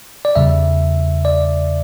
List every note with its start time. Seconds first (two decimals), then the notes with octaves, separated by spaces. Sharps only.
0.25 D5
0.36 E2 C#3 G3 E5
1.25 D5